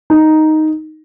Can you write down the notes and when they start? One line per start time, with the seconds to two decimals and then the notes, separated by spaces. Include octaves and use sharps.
0.10 D#4